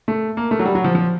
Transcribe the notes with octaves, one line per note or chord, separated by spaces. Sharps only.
A3
A#3
A3
F#3
G3
F#3
F3
F3